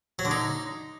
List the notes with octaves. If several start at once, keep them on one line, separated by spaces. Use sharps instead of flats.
F#3
D3
D#4